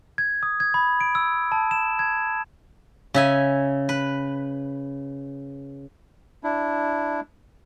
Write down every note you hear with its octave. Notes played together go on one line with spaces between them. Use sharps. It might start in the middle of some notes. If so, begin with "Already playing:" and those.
G#6
D#6
G#6
B5
D7
E6
A5
E7
G#6
C#3 E5 G#5
B4
D4 E4